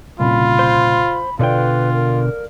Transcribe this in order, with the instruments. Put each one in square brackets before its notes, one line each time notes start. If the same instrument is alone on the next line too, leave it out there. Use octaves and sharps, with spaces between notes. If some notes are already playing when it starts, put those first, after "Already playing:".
[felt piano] C2 A#2 C#3 [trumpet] F4 [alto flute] B5
[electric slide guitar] C5
[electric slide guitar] B2 D3 G5 [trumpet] F4 [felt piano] A4 D5 F5 [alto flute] B4
[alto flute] A#4